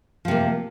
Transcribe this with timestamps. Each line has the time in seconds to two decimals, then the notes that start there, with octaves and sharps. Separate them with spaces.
0.25 F3
0.28 C3
0.31 A#3